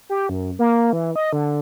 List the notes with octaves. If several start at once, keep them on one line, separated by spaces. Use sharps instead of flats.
G4
F#2
A#3
E3
D#5
D3